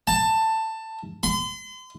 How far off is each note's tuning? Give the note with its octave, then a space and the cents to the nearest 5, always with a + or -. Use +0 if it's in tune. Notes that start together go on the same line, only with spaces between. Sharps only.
A5 +15
C6 -40